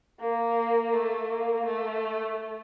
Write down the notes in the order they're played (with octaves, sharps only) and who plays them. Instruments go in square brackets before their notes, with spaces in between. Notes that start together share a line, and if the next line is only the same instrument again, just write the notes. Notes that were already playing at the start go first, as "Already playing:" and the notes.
[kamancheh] A#3
A3
A#3
A3